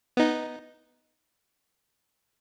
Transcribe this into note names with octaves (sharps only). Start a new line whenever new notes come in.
B3 D#4